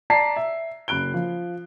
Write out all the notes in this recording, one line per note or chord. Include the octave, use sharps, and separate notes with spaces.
D5 A5 A#5 B6 C7
E5
F#1 B5 F#6 D7 G7
F3